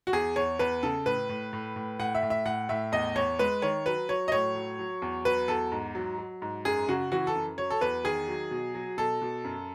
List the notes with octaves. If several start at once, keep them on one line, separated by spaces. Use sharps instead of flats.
F#4
E2 G#4
E2 C#5
E2 B4
C#3 A4
A2 B4
A2
A2
A2
A2 F#5
E5
A2
E5
A2 F#5
A2 E5
E2 D#5
E2 C#5
G#3 B4
D#3 C#5
F#3 B4
F#3 C#5
D#5
A2 C#5
F#3
F#3
E2
F#3 B4
E2 A4
G#2
F#3
F#3
G#2
F#2 G#4
C#3 F#4
E3 F#4
A4
F#2
F#3 C#5
A4
E2 B4
D#3 G#4
F#3
B2
F#3
B2 A4
B2
F#2